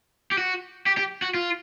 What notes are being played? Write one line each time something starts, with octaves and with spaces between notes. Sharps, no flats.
G4
F#4
G4
G4
F#4
F4